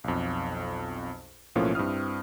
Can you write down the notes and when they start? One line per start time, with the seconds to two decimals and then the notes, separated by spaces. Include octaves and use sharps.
0.04 B1 F2
1.55 B1 A2 F3 A#3 C#4 F4
1.75 G2 C4 E4 D#6 F6